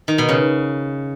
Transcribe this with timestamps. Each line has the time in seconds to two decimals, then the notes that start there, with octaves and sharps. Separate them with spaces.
0.08 D#3
0.18 B2
0.29 C#3